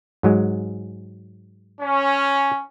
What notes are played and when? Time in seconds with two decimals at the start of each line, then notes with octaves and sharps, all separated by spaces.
0.23 G#2 F#3 G#3
1.81 C#4